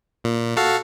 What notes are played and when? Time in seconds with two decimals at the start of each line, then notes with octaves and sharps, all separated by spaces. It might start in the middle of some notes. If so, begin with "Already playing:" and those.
0.24 A#2
0.57 F#4 A4 F5